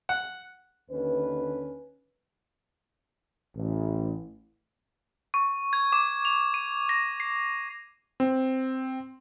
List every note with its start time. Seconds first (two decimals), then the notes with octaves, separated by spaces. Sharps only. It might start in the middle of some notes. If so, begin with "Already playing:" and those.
0.09 F#5
0.91 D#2 D3 C#4 B4
3.56 A1
5.34 C#6
5.73 G#6
5.92 D6
6.25 F7
6.54 D#7
6.89 A#6
7.20 C7
8.20 C4